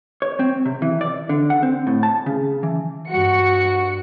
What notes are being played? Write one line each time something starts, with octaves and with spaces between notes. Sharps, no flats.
C#5
C4
C3
E3
D5
D3
F#5
C4
A2
A5
C#3
E3
G2 F#4 C#7